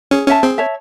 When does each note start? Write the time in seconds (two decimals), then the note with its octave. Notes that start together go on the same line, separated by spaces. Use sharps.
0.11 C#4 G#4
0.27 C#4 C#5 E5 A5
0.43 C4 G#4
0.58 C#5 E5 A5